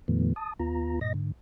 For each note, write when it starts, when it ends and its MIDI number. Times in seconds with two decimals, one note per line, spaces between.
0.08 0.33 41
0.08 0.33 46
0.08 0.33 51
0.08 0.33 53
0.08 0.33 57
0.08 0.33 59
0.36 0.53 81
0.36 0.53 87
0.60 0.99 39
0.60 0.99 59
0.60 0.99 65
0.60 0.99 82
1.01 1.13 43
1.01 1.13 46
1.01 1.13 75
1.01 1.13 94
1.14 1.32 44
1.14 1.32 50